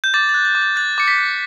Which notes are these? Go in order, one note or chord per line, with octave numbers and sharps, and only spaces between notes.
G6
D6 A6
A6
F#6
A6
D6
A6
F#6 A6
D6 C#7
B6
F#6